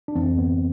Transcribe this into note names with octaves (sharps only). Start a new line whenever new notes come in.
D4
F2 E3 C4
B3